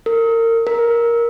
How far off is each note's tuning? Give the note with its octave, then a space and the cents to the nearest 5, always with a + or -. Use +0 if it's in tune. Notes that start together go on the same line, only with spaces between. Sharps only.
A#4 -30
A#4 +5